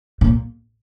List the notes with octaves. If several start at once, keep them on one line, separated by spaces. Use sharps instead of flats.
A#2